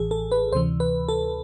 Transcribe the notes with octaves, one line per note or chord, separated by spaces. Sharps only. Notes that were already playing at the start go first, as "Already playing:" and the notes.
Already playing: A1 A2 E3 G#4
A4
B4
D2 C3 E3 C5
B4
A4